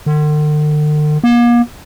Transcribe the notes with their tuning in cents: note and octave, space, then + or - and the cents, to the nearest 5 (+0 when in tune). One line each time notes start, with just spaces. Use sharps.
D3 +45
A#3 +40